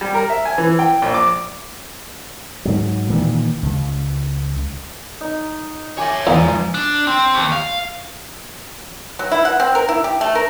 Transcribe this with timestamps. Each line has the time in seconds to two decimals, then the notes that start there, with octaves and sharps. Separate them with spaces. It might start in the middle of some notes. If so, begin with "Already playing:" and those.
0.01 G3
0.14 A#4
0.30 E5
0.45 G#5
0.58 E3
0.79 G5
1.02 A#1
1.14 D6
2.65 G#2 F#3
3.10 A#2 D#3 E3
3.63 C#2
5.21 D#4
5.98 C#5 E5 G#5 C6 D6
6.27 E2 G#2 F3 A#5
6.74 D4
7.07 C4
7.34 D#2
7.52 F5
9.19 F#3
9.31 E4
9.45 F#5
9.60 C4
9.75 A#4
9.89 E4
10.04 G4
10.21 A3
10.35 A#4